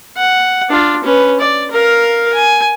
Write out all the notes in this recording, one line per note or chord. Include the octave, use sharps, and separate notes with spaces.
F#5
D4 F4
C#4 B4
D5
A#4 F5
G#5